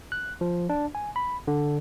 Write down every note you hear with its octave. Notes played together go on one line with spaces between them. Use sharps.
F#6
F3
D4
G#5
B5
D3